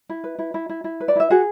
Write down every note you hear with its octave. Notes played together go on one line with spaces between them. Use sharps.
E4
B4
E4
E4
E4
E4
B4
D5
E4 E5
F#4 G#4 F#5